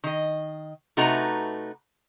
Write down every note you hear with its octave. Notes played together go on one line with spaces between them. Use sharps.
D#3 D#5
C3 A3 D#4 F#4 B4 A#5